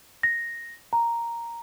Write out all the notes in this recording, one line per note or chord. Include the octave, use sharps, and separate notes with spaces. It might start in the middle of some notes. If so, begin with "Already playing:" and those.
A#6
A#5